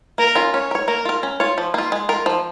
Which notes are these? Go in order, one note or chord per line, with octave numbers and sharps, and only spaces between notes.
A#3 A#4
C#4 F4
C#4 C#5
A#4 C#5
A#3 A#4
F4 A#4
C#4
F4 C#5
F3
A#3 F4
G#3
F4 A#4
F3